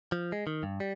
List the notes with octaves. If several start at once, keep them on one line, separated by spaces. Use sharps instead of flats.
F3
G#3
D#3
G2
G3